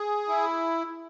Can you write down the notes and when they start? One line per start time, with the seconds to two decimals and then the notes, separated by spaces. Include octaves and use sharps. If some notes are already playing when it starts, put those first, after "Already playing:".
Already playing: G#4
0.29 E4